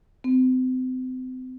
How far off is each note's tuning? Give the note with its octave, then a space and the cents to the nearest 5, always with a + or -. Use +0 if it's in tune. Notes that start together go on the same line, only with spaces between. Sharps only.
C4 -35